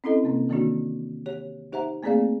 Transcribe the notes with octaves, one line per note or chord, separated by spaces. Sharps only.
C4 C#4 E4 A4 D#5
C3 A#3 C4
D#3 E3 A#3 C4 D4 F#4
G4 C#5
D#4 G4 C5 E5 F#5 A#5
A3 A#3 C4 G#4 D5 F5